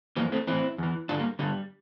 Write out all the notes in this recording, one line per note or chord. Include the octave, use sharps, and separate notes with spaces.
F2 E3 G3 A#3
A3 C4
A2 E3 C4 E4
E2 E3
G2 D3 D4 F4
G3 A#3
G2 D3 G3